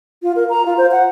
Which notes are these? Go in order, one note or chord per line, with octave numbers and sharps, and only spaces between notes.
F4
A#4
A#5
F4
C5
F#5